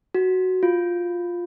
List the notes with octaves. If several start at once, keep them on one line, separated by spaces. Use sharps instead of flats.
F#4
F4